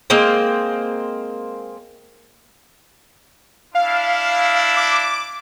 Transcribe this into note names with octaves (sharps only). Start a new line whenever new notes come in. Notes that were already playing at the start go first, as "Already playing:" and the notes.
G#3 A#3 C4 C5
D4 E4 F5
D6